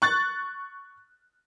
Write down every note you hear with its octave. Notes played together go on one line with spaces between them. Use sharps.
C#6 F#6 A6